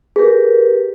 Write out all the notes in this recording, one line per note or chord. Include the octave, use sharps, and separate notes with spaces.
G4 G#4 A#4 B4